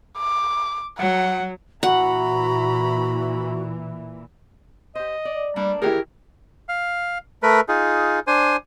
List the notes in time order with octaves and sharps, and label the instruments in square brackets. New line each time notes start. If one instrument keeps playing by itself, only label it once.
[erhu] D6
[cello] F#3 [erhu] F#5
[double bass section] A#2 E3 [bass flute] F#4 [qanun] F#5 [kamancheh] A#5 B5
[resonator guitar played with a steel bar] G4 C5 [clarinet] D#5
[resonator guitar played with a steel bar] D5
[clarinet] G3 [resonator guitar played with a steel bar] A3 A#3 D4
[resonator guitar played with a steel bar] D#3 E3 C#5 [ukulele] E4 G4 G#4 [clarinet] A#4
[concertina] F5
A3 A#4 B4
D#4 F4 G#4
D4 C5 G#5